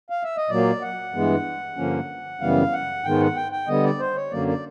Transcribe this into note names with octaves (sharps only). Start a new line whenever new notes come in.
F5
E5
D#5
A#2 F#3 A#3 D5
F#5
G2 E3 G#3 B3
G2 D3 F3 A#3 C#4
F#2 C#3 E3 G3 B3 F5
F#5
G#2 D#3 G#3 B3 G5
F#5
G5
G5
D3 G3 B3 D#5
D5
C5
C#5
F#2 D3 F#3 A#3 D5
D5